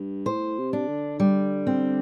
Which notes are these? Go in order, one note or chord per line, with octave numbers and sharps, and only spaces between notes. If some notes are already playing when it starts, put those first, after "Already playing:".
Already playing: G2
A2 C5
C3
D4
D3
G3
C4